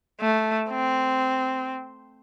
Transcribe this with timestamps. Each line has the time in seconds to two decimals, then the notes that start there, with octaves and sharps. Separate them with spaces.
0.21 A3
0.69 C4